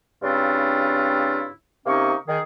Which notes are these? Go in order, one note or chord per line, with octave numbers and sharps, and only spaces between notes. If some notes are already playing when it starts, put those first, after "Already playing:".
G2 C#3 C4 D4 E4 F4
C3 A#3 C#4 D#4 D#5 C#6
D#3 G#4